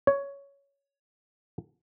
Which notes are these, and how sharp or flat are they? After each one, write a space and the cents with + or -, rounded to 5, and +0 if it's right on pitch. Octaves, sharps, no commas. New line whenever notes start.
C#5 +10